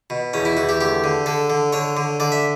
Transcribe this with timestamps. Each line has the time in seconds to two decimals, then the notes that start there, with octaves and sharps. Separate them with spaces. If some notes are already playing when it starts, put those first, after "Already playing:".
0.10 B2
0.34 E2 C#4
0.45 E4
0.57 E2 F#4
0.69 G4
0.81 D2 G4
1.04 D3
1.26 D3 A4
1.50 D3
1.73 D3 C#5
1.97 D3
2.20 D3 D5
2.32 E5